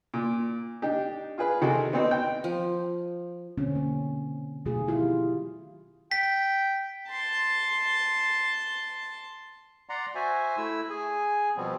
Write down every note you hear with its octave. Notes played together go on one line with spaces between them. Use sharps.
A#2
D4 D#4 G4
F4 G#4 B4
C3 D#3 F#4 G#4 A4
B3 C4 D#4 F#4
G5
F3
B2 D3 C4 C#4
A#3
B2 D#3 F#3 A3 F4 G#4
E4 F4 G4
G5 B6
A5 C6
D5 F#5 A#5 C6
F#4 C5 E5 G#5
A3 E4 E6
G#4 G#5
B2 F3 G3 B3 C4